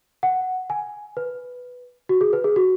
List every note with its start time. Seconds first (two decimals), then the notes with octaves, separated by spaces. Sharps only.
0.23 F#5
0.70 G#5
1.17 B4
2.09 F#4
2.21 G#4
2.33 B4
2.44 G#4
2.56 F#4